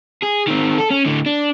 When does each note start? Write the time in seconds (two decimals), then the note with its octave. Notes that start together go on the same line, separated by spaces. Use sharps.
0.22 G#4
0.47 D#3 C4
0.78 A4
0.91 C#4
1.06 A2 D3
1.26 D4